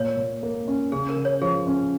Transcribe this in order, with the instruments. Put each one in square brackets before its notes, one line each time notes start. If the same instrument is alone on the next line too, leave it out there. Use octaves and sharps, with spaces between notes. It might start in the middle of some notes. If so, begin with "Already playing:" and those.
Already playing: [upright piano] A#2 [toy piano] C#5
[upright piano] A#2
A#3
C#4
[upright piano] C#3 [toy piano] G#4
[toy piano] A#4
[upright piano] C#3
[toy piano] C#5
[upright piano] F3 [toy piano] G#4
[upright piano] C#4